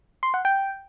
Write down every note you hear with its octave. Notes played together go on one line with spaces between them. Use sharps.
C6
F#5
G5